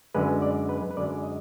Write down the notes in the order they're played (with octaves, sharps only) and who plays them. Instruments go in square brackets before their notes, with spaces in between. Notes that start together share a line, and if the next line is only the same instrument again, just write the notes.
[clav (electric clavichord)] F#2 D3 G#3 B4
D5
B4
B4
F#2 D3 G#3 D5
D#5